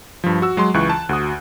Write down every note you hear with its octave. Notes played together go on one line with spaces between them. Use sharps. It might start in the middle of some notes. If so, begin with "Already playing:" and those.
G2 F3
F#4 E6
F#3 G#3 C6
C#2 E3 C#6 F#6
A5
D2 F#4 D#6